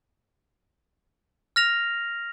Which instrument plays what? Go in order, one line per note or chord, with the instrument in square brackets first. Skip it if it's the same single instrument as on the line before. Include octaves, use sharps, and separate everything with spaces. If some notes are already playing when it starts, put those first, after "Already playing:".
[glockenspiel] F6 A#6 F7